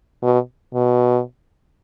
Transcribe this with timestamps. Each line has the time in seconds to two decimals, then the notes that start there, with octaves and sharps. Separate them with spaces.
0.23 B2
0.74 B2